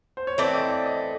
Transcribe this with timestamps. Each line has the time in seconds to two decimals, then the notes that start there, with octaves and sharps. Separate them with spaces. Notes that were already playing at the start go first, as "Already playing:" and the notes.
0.17 C5
0.27 C#5
0.38 E3 A3 C4 D5
0.54 D#5
0.69 D5
0.86 D#5